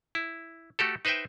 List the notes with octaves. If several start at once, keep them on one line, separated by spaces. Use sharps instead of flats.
E4
A3 F#4 G4 A4
D#4 B4 C5 D#5 E5 G5